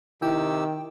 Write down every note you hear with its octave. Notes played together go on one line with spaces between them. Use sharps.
C3 D#3 E4 G4 G5 E6